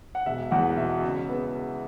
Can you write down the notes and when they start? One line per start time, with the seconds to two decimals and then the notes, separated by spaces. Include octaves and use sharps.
0.15 F#5
0.26 E1 E5
0.51 E2 F#5
0.77 B2 E5
1.02 C#3
1.28 B3